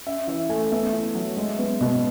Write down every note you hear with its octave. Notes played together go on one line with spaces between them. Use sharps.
C#4 E5
E3 E5
A3 G#5
B3 E5
E4
F#3
G#3
B3
B2